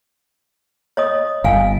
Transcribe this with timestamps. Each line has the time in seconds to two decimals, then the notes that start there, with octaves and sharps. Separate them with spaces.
0.97 C#5 D#5 D#6
1.44 G1 F5 G#5